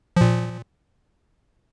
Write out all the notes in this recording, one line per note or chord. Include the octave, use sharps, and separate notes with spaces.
A#2 F3